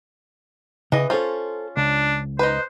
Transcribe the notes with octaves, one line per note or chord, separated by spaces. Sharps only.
C#3 E3 D#5
C#4 F4 A4 C5
C#2 D4
D#4 B4 C5